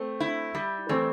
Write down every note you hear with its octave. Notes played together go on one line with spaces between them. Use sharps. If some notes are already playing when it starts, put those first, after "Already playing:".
Already playing: A3 C4
E4
G3
E3 A3 C4